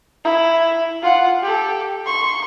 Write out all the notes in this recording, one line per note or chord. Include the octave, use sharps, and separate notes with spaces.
E4
F4 F#5
G4 A4
C6 C#6